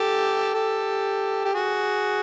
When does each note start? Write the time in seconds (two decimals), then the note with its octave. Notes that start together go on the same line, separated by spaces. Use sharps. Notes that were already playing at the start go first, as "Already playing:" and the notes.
Already playing: G4 A4
0.54 G4 A4
1.45 G4
1.54 F#4 G#4